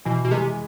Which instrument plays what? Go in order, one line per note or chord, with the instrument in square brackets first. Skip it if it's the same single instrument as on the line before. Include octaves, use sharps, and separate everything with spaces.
[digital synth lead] B2 [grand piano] E3
[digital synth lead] B2
[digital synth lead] C3 [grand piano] G#3